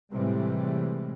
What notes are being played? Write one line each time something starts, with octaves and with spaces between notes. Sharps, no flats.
A2 C3 E3 G3 G#3